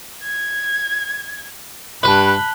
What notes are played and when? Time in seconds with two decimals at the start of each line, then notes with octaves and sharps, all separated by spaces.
0.23 G#6
2.03 G2 B4 A5 B5 F#6 G7